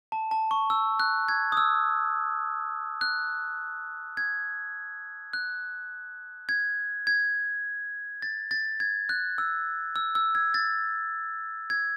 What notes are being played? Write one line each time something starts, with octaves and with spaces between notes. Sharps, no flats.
A5
A5
C#6
E6
F#6
G#6
D#6
E6
F#6
G#6
F#6
G#6
G#6
A6
A6
G#6
F#6
E6
E6
E6
G#6
A6
G#6